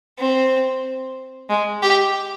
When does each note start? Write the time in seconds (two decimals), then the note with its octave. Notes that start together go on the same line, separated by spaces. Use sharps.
0.19 C4
1.50 G#3
1.82 G4